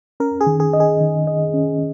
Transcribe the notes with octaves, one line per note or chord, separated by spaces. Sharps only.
C#4 A#4
G#4
D#3
G#4
D#5
G#4
D#3
D#5
C#4